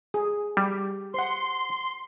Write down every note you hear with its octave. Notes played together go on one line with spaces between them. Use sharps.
G#4
G3 G4
C5 F#5 C6